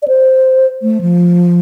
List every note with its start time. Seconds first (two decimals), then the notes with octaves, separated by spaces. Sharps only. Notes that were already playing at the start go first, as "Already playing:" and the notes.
0.02 D5
0.08 C5
0.82 A3
1.01 F3